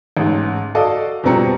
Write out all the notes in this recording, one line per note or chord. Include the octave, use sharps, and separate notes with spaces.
A1 G#2
F#4 A4 D5 D#5 F5
F2 B2 G3 C4 A#5 C#7